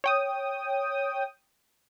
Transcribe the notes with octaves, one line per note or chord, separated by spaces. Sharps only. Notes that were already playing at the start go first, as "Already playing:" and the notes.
C#5 G5 D#6